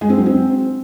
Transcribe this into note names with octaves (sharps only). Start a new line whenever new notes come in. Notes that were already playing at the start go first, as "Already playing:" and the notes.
G#3
C4
F#3
C4